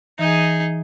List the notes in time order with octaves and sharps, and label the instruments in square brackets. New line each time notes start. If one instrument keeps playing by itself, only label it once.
[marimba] E3 [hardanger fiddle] D#4 G#4